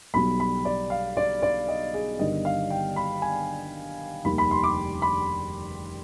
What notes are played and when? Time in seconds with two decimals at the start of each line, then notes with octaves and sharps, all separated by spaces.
0.14 B1 B2 G3 B5
0.40 B5
0.65 D5
0.90 F5
1.17 D5
1.42 D5
1.68 D#5
1.94 G#4
2.19 G1 G2 D#3 G3 D#5
2.45 F5
2.70 G5
2.96 B5
3.22 G#5
4.25 F1 D#2 D#3 G3 B5
4.38 B5
4.51 C6
4.63 D6
5.02 B5